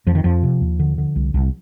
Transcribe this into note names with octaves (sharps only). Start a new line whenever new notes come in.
F2 F3
D#3
F2 F3
C3
D#2
D3
D3
C2
C2